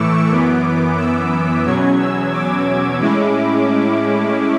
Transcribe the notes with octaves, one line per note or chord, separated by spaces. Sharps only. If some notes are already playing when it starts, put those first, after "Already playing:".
Already playing: A2 E3 A3 C#6 D6 E6
F#2 E3 B3
E6
E2 B2 F#3 C#4 G#6
E6
D6
A2 G#3 C#4 E4